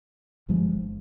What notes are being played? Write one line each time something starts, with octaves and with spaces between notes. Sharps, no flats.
G1 G2 F3 G#3